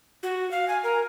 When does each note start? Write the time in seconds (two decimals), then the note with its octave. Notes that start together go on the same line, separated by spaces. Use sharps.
0.23 F#4
0.51 F5
0.68 G#5
0.84 A#4